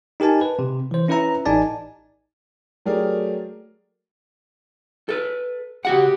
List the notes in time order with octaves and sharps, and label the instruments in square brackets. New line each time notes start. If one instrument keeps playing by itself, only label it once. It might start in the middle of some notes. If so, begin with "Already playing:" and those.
[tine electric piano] D#4 G4 A#4 G#5 A5
B4
C3
E3 C5
C#4 E4 B4 E5 A#5
A1 D#4 D5 G#5 A5
[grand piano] F#3 A3 G4 G#4 A#4 D5
[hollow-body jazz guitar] A4 B4
[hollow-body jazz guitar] C#3 F#4 F#5 [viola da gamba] G4